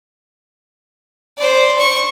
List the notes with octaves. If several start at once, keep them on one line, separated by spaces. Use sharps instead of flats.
C5 D5
C#6